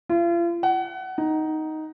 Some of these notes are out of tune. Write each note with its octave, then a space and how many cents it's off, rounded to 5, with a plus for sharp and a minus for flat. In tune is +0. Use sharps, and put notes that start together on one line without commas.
F4 -40
F#5 +25
D#4 +5